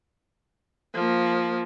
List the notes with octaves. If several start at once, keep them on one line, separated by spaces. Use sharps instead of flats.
F3 A#3